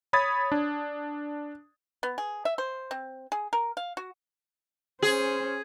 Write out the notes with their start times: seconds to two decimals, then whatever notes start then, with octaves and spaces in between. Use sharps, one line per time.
0.13 C#5 B5 D#6 G#6 A6
0.52 D4
2.03 B3
2.18 G#4
2.45 E5
2.58 C5
2.91 C4
3.32 G#4
3.53 A#4
3.77 F5
3.97 F#4
5.02 C#4 G#4 C5